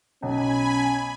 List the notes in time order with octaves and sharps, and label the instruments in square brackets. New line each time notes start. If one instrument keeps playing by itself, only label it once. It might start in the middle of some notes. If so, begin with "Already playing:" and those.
[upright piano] B1 [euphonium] C#4 [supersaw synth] G#5 B5